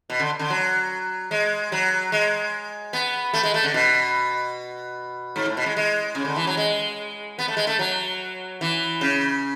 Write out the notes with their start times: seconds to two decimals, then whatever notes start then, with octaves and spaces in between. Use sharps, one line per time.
0.10 B2
0.20 D3
0.39 D3
0.50 F#3
1.31 G#3
1.72 F#3
2.12 G#3
2.93 B3
3.34 A3
3.43 G#3
3.54 A3
3.63 D3
3.74 B2
5.36 G#2
5.46 A2
5.57 B2
5.66 G#3
5.77 G#3
6.15 C#3
6.25 D3
6.36 E3
6.47 F#3
6.57 G#3
7.39 B3
7.48 A3
7.57 G#3
7.67 A3
7.79 F#3
8.61 E3
9.01 C#3